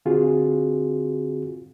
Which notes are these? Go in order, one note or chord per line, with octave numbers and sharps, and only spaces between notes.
D3 C4 F4 F#4 G#4